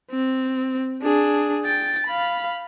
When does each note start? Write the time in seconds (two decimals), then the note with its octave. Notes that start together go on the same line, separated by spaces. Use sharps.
0.11 C4
1.02 D4 G#4
1.65 G5 A6
2.07 F5 B5